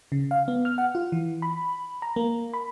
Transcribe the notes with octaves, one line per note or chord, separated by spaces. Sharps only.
C#3
F5
B3
F6
F#5
F4
E3
B5
A#5
A#3
B5